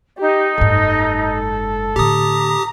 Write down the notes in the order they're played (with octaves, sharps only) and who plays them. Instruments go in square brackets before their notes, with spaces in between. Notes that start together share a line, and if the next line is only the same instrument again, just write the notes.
[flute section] D#4 [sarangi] G4
[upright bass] F#1 G#2 [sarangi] A4
[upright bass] A2 D3 [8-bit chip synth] G4 D#6 [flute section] A#5